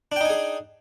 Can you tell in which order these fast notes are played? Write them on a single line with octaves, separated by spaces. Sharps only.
D4 G5 D#4 G#5 G#4